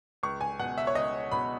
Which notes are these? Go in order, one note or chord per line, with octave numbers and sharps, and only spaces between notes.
C#2 C#6
G#5
B2 F#5
E5
C#5
C#2 D#5
B2 B5